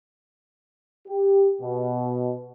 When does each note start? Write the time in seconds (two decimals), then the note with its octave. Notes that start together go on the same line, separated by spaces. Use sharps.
1.08 G4
1.62 B2